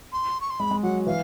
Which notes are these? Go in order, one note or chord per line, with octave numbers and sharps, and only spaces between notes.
C6
C#6
C6
G#3 B5
G#3
F#3 F#5
E3 F5